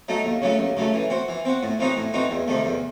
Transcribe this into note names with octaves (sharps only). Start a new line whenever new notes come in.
F#3 A3 D#4
D#2
C#3 F#3 A3
D#2
C#3 F#3 A3
E3
C4 F#4
E3
C4 F#4
A2
E3 C4 D#4 F#4
A2
E3 C4 D#4 F#4
E2
C3 D#3 A3
E2